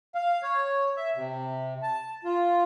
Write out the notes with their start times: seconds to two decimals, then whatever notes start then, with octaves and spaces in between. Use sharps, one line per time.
0.15 F5
0.43 C#5
0.97 E5
1.16 C3
1.83 A5
2.24 F4